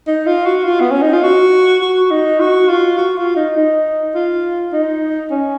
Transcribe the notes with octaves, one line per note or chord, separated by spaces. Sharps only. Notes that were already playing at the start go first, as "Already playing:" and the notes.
D#4
F4
F#4
F4
B3
C#4
D#4
F4
F#4
F#4
D#4
F#4
F4
F#4
F4
D#4
D#4
F4
D#4
C#4